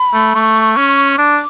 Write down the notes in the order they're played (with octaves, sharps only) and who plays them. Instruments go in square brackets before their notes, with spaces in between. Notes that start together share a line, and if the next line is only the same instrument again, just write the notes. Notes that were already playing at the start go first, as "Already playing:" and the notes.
Already playing: [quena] B5
[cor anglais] A3
[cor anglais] A3 [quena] C#6
[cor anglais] C#4
[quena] C#6
[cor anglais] D4 [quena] D6